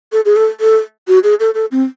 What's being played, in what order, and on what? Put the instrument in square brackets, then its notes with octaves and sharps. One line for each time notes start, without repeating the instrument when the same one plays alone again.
[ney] A4
G#4
A4
A4
F#4
G#4
A4
A4
C4